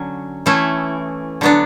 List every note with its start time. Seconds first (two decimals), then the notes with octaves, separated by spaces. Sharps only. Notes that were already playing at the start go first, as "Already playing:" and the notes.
Already playing: D3 F#3 C#4
0.46 E3 A3 C#4 E4
1.41 D3 F#3 B3 D4